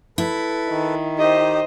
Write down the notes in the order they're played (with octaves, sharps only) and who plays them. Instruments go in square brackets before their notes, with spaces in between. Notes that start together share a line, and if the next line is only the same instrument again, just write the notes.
[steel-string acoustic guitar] E4 [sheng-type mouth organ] A4 B4
[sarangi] D#3
[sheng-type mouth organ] D#4 G4 [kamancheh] C5 D#5